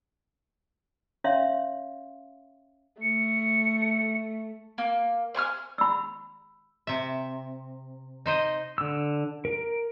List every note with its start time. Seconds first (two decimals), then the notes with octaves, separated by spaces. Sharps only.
1.24 C#4 C#5 E5 F5 C6
3.02 A3 C#7
4.78 A#3
5.35 C5 G#5 C#6 F6
5.78 B5 E6
6.87 C3 E5
8.26 D#4 C5 D#5
8.78 D3 E6
9.45 A#4